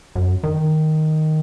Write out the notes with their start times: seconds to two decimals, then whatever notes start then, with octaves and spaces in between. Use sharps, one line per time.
0.16 F#2
0.44 D#3